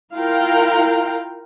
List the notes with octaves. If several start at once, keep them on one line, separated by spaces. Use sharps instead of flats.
E4 F4 A#4 F5 G5 A#5